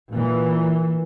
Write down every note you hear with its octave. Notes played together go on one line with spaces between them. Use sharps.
A#2 E3